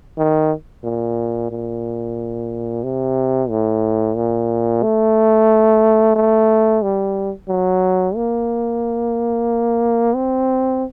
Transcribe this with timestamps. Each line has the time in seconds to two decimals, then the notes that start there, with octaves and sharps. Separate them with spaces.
0.18 D#3
0.84 A#2
1.51 A#2
2.84 C3
3.50 A2
4.16 A#2
4.83 A3
6.16 A3
6.82 G3
7.49 F#3
8.15 A#3
10.15 C4